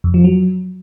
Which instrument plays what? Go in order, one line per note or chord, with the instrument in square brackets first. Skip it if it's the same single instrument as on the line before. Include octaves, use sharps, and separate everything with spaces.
[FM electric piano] F2
F3
F#3